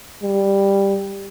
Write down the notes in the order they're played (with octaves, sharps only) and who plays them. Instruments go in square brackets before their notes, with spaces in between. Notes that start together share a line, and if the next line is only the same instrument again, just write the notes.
[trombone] G3